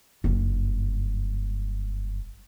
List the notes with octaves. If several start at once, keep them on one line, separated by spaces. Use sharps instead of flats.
F#1 G2